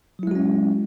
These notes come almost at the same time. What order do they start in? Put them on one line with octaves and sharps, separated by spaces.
F#3 E4 G#3 F#4 C#4